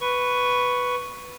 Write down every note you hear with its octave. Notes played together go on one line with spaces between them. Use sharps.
B4 C#6